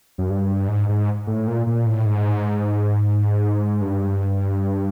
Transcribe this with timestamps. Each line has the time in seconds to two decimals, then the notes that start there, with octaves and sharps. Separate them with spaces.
0.18 F#2
0.30 G2
0.68 G#2
0.89 G#2
1.27 A2
1.47 A#2
1.67 A#2
1.86 A2
2.06 G#2
3.81 G2